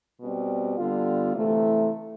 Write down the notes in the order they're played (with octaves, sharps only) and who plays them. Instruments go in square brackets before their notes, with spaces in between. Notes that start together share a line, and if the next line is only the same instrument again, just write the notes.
[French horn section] B2 G3 C4
D3 G3 B3 F4
C3 E3 A3 E4